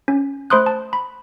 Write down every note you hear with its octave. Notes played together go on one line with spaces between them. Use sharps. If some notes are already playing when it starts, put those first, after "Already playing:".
C#4
A3 C5 B5 C6 D#6 F#6
A5
B5